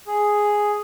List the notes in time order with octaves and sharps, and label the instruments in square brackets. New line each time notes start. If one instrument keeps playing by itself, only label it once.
[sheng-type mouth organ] G#4